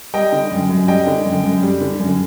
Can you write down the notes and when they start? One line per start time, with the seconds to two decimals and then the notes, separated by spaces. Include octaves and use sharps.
0.14 G3 D#5 G5
0.32 D3
0.52 F#2
0.69 F#2
0.88 G3 D#5 G5
1.07 D3
1.26 F#2
1.43 F#2
1.63 G3
1.81 D3
2.00 F#2